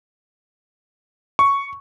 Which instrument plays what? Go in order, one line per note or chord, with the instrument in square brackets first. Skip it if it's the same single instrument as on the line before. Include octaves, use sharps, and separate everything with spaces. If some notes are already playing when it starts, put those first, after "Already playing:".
[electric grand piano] C#6